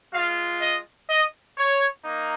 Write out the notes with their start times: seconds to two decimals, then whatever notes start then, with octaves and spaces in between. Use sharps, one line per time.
0.13 G#3 F4 F5
0.61 D#5
1.09 D#5
1.57 C#5
2.05 A#3 D#4